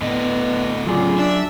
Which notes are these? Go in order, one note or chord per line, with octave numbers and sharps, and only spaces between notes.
A2 D3 B3 D#5
C#3 F#3 F4 G#4 D5
D4 E5